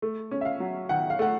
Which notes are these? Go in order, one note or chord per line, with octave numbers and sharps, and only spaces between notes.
A3
C#4
E5
F5
F#3
D#3 F#5
F5
A3 F#5